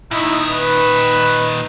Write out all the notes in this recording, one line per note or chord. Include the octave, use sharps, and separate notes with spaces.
A#2 D#3 D#4 E4
B4